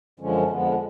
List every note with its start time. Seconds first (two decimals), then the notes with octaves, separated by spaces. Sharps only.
0.20 F#2 D3 F3 G#3 C#4
0.50 F2 D3 F3 G#3 B3